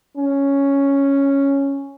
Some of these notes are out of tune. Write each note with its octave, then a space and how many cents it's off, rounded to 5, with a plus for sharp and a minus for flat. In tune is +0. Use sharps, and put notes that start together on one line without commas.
C#4 +0